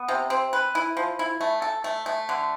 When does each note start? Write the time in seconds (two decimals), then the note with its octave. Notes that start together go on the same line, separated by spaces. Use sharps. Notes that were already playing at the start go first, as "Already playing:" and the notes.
Already playing: B3
0.08 C3
0.30 C4
0.53 B4
0.75 E4
0.97 F3
1.19 E4
1.41 A3
1.62 A4
1.84 A3
2.06 A3
2.29 D3